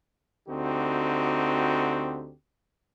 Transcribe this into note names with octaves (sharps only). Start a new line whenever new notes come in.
D2 D3 C4 D#4 F#4 G4